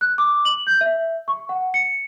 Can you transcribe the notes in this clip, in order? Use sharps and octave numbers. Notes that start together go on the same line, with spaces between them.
F#6
D6
F#7
G6
E5
C#6
F#5
C#7